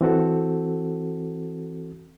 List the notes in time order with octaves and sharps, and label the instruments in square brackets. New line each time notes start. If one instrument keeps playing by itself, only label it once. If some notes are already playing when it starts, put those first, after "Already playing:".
[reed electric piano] E3 C4 F#4 A4